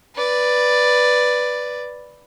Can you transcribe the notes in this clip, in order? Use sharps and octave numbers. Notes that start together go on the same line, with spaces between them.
B4 D5